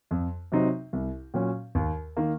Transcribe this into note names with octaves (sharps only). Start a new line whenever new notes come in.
F2
C3 F#3 C4 D#4
C2
A#2 F#3 C#4
D#2
D#3 A#3